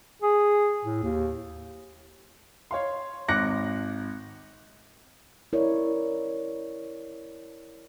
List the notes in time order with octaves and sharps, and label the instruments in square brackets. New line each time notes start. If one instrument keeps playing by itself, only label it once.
[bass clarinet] G#4
A2
D#2
[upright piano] C#5 F5 C6
G#1 D6 F#6 A#6 C#7
[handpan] E4 A#4 C#5 D5